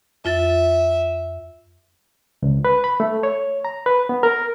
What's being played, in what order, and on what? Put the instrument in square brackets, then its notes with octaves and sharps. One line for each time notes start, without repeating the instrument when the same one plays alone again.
[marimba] F2 F4 A6 [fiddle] E5
[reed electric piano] C#2
B4
B5
A3
C#5
A#5
B4
B3
A#4